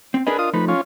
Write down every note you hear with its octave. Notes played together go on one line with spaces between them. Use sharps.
C4
D4 G#4 A#4 B4 D#5
F4 D#6
F3 A3 D#4 B4
C#4 F4